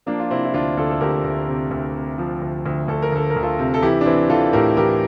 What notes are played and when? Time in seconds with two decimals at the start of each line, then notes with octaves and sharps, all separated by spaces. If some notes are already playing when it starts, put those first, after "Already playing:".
0.06 F3 A#3 D4
0.19 F4
0.30 C3 C4 E4
0.44 E4
0.54 D2 D4 F4
0.77 D2 F4 A4
0.90 A4
1.01 D2 G4 A#4
1.24 D2
1.48 C3
1.71 D2
1.95 C3
2.18 F3
2.42 D2
2.66 D2
2.88 D2 A4
3.02 A#4
3.12 D2 A4
3.30 A#4
3.36 D2
3.43 F4 A4
3.59 C3
3.74 A4
3.82 E3 E4 G4
4.01 D4
4.06 E3 C4 E4
4.29 E3 F4 A4
4.53 A2 G4 A#4
4.77 E3 G4 A#4